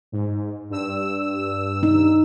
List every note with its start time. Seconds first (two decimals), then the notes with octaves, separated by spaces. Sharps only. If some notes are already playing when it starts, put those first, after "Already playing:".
0.12 G#2
0.70 G2 E6
1.83 D#4